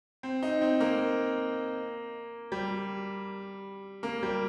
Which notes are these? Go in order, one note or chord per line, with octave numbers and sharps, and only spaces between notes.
C4
D#4
C4
A#3
G3
A#3
G3